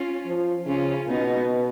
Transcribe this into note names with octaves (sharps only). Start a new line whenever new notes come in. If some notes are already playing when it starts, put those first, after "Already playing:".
Already playing: C#4 F4
F3
C#3 C#4 F4
B2 B3 D#4